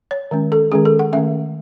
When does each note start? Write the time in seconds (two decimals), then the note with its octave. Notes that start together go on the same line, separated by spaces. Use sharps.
0.11 C#5
0.31 D#3 G#3 C#4
0.52 A4
0.72 D#3 G#3 C#4 G#4
0.85 A4
0.99 F#5
1.13 D#3 A3 C#4 E5